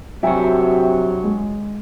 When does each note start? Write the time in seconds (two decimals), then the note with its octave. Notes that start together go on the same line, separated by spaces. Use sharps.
0.23 G2 C3 F#3 F#4 E5 G5 G#5
1.24 G#3